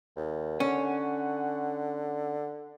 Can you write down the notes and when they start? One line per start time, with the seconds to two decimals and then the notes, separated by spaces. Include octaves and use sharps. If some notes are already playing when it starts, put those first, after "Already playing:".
0.16 D#2
0.60 D3 C#4 F#5